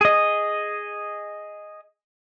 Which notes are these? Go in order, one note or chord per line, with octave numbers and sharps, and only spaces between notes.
G#4 D#5